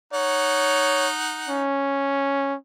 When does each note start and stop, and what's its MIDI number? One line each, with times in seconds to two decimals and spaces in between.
0.13 1.63 63
0.13 1.08 73
0.13 1.63 78
1.49 2.56 61